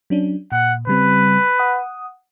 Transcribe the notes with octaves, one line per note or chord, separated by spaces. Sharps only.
F#3 C#4 D4
A#2 F#5
C#3 G3 C4 B4
F#5 D#6